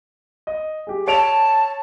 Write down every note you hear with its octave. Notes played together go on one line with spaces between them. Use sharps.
D#5
G4 G#4
C#5 A5 D7 F7